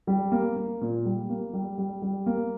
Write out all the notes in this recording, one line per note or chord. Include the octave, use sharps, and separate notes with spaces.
G3
A#3
A#3
A#2
G3
A#3
G3
G3
G3
A#3